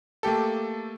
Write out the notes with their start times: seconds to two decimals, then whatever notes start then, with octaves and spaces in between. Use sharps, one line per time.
0.23 A3 A#3 G4 A4